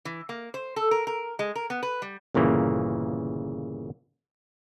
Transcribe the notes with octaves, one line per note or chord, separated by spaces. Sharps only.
E3
A#3
C5
A4
A#4
A#4
G#3
A#4
B3
B4
G3
G1 A#2 C#3 E3 A#3